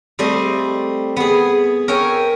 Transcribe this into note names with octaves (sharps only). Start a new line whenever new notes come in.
G3 A3 C4 D#5
B3 G#4
A#4 C#5 E5 G5 G#5